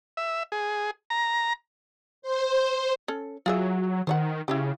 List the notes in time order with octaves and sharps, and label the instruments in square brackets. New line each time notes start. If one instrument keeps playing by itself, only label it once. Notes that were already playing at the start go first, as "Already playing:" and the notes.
[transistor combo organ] E5
G#4
A#5
[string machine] C5
[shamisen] C#4 A4
[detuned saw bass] F#3 [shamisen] F4 G#4 E5
[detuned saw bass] D#3 [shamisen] C5 C#5 F#5
[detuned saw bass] C#3 [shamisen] E4 F4 G4